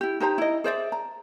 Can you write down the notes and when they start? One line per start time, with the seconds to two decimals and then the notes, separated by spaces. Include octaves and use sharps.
0.01 E4 G4
0.20 D#4 G4 C5 A#5
0.38 E4 D#5
0.64 G#4 C5 D5 E5
0.92 A#5